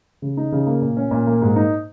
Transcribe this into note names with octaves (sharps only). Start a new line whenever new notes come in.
C#3
D#4
C#3
A#3
A#2
C#4
A#2
A#3
G#2
D#4